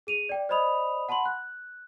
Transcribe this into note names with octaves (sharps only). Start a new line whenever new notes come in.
G#4 D#7 F7
D5 G5
C5 D5 D#5 B5 D#6 F7
F#5 A5 B5 C6 F#7
F#6